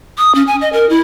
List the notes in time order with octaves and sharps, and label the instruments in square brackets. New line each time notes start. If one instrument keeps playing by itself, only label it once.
[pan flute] D#6
C#4
G#5
D#5
A#4
E4